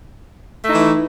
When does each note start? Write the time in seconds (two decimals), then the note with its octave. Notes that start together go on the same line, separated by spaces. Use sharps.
0.64 A3
0.67 D#4
0.71 E4
0.74 E3